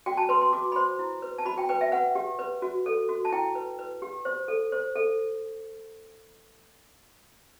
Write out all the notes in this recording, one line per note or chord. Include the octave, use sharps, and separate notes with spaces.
F#4 G5
A5
B4 C6
C6
F#4 D6
B5
C5 C6
E4
B4
A5
F#4 B5
G5
B4 G5
E5
B4 F#5
G4
B4
F#4
A4
F#4
A5
E4 G5
B4
B4
G4
C5
A4
C5
A4